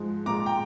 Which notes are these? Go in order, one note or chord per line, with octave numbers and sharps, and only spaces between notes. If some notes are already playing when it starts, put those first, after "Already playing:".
Already playing: G#2 F3 G#3
A#2 G#3 A#5 D6
G5 A#5